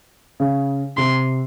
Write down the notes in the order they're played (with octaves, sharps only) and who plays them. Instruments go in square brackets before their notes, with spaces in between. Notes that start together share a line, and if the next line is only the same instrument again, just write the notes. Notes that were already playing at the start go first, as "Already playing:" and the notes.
[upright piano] C#3
[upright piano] C3 [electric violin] C6